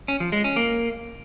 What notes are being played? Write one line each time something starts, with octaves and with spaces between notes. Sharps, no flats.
C#4
F3
G#3
C#4
A#3